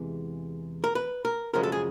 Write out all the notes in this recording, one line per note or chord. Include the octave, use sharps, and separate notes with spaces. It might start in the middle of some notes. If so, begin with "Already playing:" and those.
Already playing: E2 C3 E3 G#3
A#4
B4
A#4
F#2 C#3 F3 G#3 A#4
A4
G#4